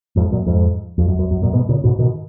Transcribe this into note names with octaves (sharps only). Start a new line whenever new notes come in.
F2 G#2
F#2 A#2
F2 G#2
F2
F#2
F#2
F#2
F#2 A#2
G#2 B2
A#2 C#3
G#2 B2
B2 D#3